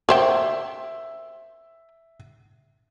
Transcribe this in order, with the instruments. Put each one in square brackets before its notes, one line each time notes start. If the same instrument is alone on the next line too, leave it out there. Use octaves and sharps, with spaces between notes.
[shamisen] A#4 C5 G5 [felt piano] E5